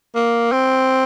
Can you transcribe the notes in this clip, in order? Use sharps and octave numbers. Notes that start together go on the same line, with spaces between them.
A#3
C4